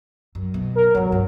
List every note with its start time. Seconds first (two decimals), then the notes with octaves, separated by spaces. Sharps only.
0.35 F#2
0.54 B2
0.75 A#4
0.95 C#2 G#2 F#3
1.12 G2